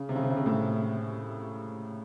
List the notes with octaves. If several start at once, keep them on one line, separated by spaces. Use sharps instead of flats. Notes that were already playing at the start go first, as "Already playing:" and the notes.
Already playing: C#3
C3
C#3
C3
C#3
C3
A2